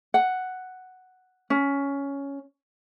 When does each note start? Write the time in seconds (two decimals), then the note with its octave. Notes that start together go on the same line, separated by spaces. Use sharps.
0.14 F#5
1.50 C#4